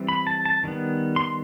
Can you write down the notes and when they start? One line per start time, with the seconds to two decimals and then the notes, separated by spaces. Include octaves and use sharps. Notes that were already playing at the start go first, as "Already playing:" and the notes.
Already playing: E3 G3 C4
0.09 B5
0.27 A5
0.45 A5
0.64 D#3 G3 B3
1.16 C6